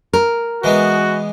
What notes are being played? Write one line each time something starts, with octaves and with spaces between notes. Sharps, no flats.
A#4
E3 G#3 B3 F#4